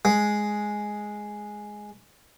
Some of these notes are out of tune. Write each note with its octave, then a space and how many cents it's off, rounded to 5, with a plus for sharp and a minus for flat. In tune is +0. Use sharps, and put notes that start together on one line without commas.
G#3 +5